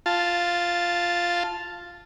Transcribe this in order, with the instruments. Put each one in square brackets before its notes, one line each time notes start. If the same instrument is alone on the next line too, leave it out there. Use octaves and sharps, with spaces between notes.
[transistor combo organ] F4 A5